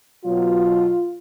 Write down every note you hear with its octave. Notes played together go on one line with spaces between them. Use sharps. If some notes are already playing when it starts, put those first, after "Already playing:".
B2 F#3 F4